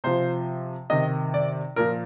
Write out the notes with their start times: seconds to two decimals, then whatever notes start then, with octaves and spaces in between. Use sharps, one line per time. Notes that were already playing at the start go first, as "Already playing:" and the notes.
0.04 C3 F3 C5
0.90 C3 D#3 D#5
1.34 D5
1.76 A#2 F3 A#4